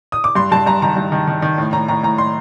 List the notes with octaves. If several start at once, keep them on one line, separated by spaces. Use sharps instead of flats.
D#6
D6
G2 C6
G2 A5
G2 A#5
D#3 A#5
G2
D#3
D#3
D#3
A2
A2 A#5
A2 A#5
A2 A#5
A2 C6